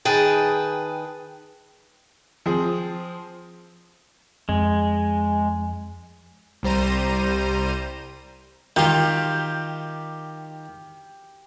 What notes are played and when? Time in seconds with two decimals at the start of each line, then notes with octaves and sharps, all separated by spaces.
0.05 D#3 G#4 B4 G5 A5
2.46 F3 C4 G#4
4.49 F2 G#3
6.63 C2 G3 C5 A#5 D#7
8.76 D#3 F4 G4 G5